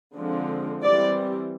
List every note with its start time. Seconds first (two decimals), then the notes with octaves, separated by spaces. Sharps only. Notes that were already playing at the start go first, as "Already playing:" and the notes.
0.17 D3 F3 G#3 C4
0.83 E3 G3 C4 D5